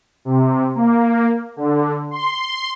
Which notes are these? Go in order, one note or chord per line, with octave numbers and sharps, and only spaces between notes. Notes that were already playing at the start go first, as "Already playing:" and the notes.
C3
A#3
D3
C6